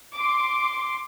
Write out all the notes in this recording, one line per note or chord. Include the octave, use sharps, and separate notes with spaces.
C6 D6